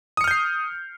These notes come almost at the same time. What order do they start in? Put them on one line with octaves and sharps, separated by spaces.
D#6 C#7 F6 G6 C7